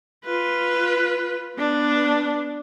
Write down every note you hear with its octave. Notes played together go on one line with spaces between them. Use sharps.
F4 B4
B3 D4